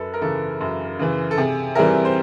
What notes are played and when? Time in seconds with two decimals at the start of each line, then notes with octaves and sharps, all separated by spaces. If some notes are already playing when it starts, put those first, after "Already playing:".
Already playing: F#2 A4 B4
0.14 A#4
0.21 C#3 E3 A4
0.61 F#2
0.99 C#3 E3
1.31 A4
1.38 C3 G#4
1.75 E3 G3 C4 E4 G#4 A#4
2.05 C5